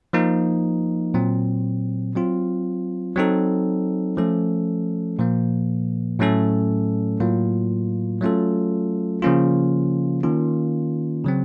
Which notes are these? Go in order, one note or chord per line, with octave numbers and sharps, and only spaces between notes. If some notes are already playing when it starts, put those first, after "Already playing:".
F3 A#3 D#4
A#2 F#3 C4
F#3 C4 F4
F#3 C4 D#4 A4
F3 A3 C#4 A4
A#2 F3 A#3
A2 F#3 A3 C#4 A4
A2 F#3 A#3 F4
F#3 A3 C#4 F4 A4
C#3 F3 A#3 C#4 F4
D#3 A#3 C#4 F4
C#3 F#3 C4